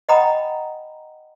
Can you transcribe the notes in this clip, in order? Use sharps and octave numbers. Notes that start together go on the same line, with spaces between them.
D#5 F#5 G5 A#5 B5 D#6